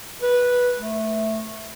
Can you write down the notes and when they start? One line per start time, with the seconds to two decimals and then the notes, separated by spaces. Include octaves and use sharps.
0.22 B4
0.79 A3